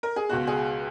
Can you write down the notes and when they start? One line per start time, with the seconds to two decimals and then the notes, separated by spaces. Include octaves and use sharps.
0.03 A#4
0.16 G#4
0.29 C#2 B2 F#4
0.47 G#4